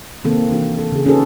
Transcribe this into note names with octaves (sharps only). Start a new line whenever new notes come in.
C3 D#3 A#3 C4 A4
E3 D4 F#4
A4
C#3 G#4
C#4 D#4 F#4 G#4 A4 B4